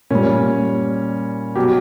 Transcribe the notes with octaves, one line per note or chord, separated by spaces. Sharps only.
A#2 G3 C#4
B2 F#3 G4